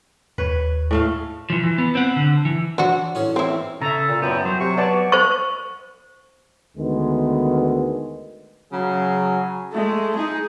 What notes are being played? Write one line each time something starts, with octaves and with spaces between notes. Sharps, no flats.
D#2 B4 C#5
A2 A3 F5
E3 F3
E3
B3
C4 F#5
D3
E3
E3 D4 F#4 C5
A1 C#4 G#4
C4 E4
C#3 A4 E5 A#5
A#2
F#2 B3 E4 G5
F#3 C5
C3 C#6
B3 C#5 D5 A5
C5 C#6
D2 D#3 G#3 B3
C#3 F#3 G#4
G#3 A3
D#4 G#4